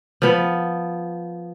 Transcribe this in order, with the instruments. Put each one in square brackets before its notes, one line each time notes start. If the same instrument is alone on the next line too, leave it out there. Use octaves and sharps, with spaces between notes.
[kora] F3 B3